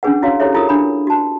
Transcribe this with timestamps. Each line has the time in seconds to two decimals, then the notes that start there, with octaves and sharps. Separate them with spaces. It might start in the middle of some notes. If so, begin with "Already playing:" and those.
0.03 C#4 D4 G#4 B4 F#5
0.22 C#4 E4 F#4 C#5 F5
0.40 E4 G4 A4 C5 C#5 E5
0.54 E4 F4 G#4 A#4 D#6
0.69 D4 B5
1.07 F#4 A5